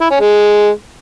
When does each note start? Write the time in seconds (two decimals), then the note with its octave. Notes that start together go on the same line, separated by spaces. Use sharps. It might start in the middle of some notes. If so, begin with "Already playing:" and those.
0.01 E4
0.11 C#4
0.21 G#3